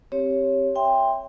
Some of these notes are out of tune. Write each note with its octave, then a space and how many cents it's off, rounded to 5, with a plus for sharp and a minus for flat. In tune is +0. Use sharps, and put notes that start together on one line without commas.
C4 +15 G4 +0 C#5 +0
E5 +0 G5 +20 C6 +0